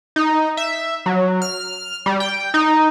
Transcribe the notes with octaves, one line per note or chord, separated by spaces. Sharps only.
D#4
E5
F#3
F6
G3
G5
D#4